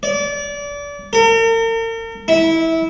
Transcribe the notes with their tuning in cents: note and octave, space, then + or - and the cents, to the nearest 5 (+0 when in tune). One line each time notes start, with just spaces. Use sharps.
D5 -30
A#4 -40
E4 -20